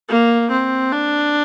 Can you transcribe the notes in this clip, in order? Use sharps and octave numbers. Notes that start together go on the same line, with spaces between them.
A#3
C4
D4